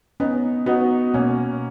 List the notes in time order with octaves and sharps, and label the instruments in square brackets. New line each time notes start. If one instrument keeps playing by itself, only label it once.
[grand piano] B3 D#4 [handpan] C#4
[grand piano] B3 D#4 [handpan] F#4
[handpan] B2 [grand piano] A#3 C#4